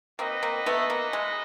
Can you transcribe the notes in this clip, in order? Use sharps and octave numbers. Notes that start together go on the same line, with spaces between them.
A#3 C4 D#4 F#4 B4 D#5
A#3 C4
A3 B3
A#3
G#3